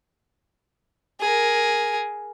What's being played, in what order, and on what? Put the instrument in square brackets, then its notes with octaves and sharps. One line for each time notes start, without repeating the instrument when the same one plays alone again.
[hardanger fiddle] G#4 A#4